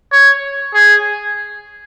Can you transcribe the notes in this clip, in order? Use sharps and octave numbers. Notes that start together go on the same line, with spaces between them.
C#5
G#4